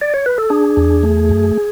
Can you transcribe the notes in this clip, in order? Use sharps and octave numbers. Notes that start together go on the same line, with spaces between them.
D5
C#5
B4
A4
D4 G#4
E2
A3
F#2